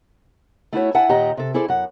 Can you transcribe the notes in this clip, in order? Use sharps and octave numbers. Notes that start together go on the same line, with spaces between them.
A3 E4 F#4 C#5
E4 F#5 G#5 A5
D#2 A#2 G4 D#5 F#5 A#5
C3 A4
E4 G#4 A4 C5 D5
F#2 F#5